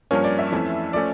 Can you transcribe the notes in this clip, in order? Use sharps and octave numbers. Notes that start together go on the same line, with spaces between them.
G2 F3 A#3 C#4 C#5
D5
E5
F2 E3 A3 C#4
F3 A3 C#4 D5